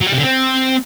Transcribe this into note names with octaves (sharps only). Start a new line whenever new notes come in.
F#3
G3
C3
D3
C4